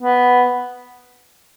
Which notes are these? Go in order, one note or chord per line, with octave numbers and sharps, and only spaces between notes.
B3